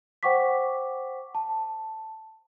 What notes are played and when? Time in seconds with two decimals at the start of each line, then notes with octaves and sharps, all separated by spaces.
0.23 C5 F#5 G5 C#6 D6 B6
1.35 A5